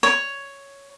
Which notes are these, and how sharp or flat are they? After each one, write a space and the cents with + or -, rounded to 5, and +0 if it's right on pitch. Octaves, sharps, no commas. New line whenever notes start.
C#5 +5